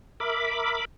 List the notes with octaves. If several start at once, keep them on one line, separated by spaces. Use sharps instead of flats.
A#4 E5 B5 D6